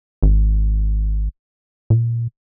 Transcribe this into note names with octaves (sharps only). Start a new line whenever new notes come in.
G#1
A#2